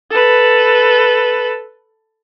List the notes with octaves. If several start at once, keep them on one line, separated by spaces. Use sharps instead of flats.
A4 B4